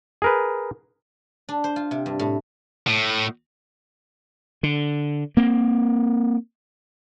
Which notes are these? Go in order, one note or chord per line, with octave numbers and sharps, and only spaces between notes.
G#4 A#4 B4
D4
C5
F4
C3
G2
A2
A2
D3
A#3 C4